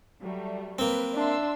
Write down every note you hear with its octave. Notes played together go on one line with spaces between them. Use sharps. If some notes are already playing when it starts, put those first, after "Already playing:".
F#3 G3 A3
A#3 C4 B4
D4 E5 C6 E6